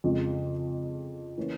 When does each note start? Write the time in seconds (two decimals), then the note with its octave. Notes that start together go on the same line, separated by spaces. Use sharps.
0.04 F2 C#3 F3 G#3
1.38 E3 A#3 C#4